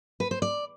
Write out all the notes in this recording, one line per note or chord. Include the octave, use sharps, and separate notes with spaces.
B4
C5
D5